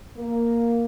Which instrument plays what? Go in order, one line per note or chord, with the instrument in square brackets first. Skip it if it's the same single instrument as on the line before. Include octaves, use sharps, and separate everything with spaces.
[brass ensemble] A#3